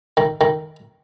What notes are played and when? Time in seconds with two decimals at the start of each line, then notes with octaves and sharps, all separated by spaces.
0.17 D#3
0.41 D#3